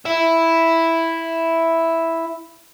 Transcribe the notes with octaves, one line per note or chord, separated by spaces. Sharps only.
E4 E5